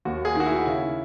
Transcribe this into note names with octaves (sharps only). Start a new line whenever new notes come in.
D#2 F#4
G#4
D#3 F#4
E4
C#3